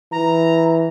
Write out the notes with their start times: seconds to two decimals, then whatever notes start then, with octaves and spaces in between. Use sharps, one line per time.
0.12 E3 A#5